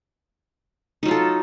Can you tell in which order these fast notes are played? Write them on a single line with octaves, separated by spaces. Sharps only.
D#4 F#3 F4 A4